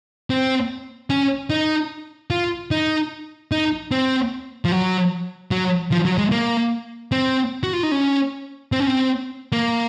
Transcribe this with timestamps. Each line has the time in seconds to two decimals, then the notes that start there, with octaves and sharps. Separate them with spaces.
0.30 C4
1.10 C#4
1.50 D#4
2.31 F4
2.71 D#4
3.52 D#4
3.91 C4
4.65 F3
4.72 F#3
5.51 F#3
5.92 F3
6.05 F#3
6.18 G#3
6.31 A#3
7.12 C4
7.63 F#4
7.73 F4
7.83 D#4
7.92 C#4
8.72 C4
8.80 C#4
8.87 C4
9.52 A#3